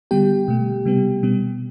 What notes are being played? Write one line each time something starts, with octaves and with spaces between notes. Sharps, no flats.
D3 G3 B3 G4 G5
B2 A3
C3 G3 B3
B2 G3 B3